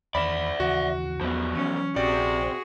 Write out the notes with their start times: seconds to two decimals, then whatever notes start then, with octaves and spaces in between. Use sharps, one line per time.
0.15 E2 D#3 D5 E5 B5 E7
0.60 D#2 C#3 E3 F#4
1.21 E2 F3 F#3 B3
1.56 E3 F#3 C#4
1.96 A#1 C3 F#4 G#4 D5